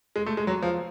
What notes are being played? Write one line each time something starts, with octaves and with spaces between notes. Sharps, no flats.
G#3
A3
G#3
F#3
F3